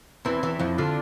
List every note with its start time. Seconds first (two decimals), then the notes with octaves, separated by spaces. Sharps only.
0.25 E2 E3 C4 E4
0.43 E2 E3
0.59 F2 F3
0.78 D3 D4 F4